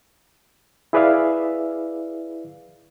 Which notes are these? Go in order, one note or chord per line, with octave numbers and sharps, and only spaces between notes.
E4 G#4 B4 D5 E5 F5